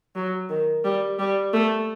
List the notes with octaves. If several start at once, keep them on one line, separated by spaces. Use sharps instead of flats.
F#3
D#3
G3
G3
A3